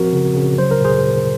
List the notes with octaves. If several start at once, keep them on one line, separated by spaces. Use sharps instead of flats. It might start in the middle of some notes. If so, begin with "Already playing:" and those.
Already playing: F3 C4 F#4 A#4
C#3
C#3
F#3 C5
A#4
A#2 G#4 C5
A#2